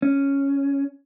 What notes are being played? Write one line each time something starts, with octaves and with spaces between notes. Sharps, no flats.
C#4